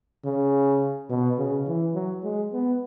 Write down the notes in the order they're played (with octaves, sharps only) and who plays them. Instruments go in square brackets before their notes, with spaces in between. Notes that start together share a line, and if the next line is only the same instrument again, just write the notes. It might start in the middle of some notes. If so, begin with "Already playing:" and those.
[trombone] C#3
B2
C#3
E3
F#3
G#3
B3